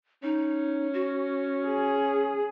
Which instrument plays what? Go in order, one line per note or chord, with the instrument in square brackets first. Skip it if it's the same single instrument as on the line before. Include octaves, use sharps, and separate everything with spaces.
[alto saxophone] C#4 [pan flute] D#4
[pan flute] F#4
[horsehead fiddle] G#4